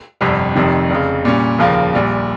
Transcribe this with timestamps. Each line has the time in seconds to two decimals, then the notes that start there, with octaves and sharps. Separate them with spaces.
0.21 G1 F2 C3 G3
0.55 F1 F2 C3 D#3
0.90 F1 F2 C#3
1.25 A#2 G3 C#4
1.59 F1 D#2 C#3 F3 A#3
1.94 A#1 A#2 G3